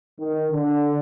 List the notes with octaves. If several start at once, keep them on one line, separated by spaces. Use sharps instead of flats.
D#3
D3